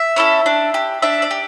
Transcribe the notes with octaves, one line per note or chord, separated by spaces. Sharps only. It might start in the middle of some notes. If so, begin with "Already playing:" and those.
Already playing: E5
C#4 E4 A4
D4
G4
D4 E5
D5
G4